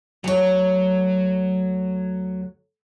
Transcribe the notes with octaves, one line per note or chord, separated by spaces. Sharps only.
D2 F#3 C#5